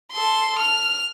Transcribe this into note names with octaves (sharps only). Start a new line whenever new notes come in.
A4 C6
F6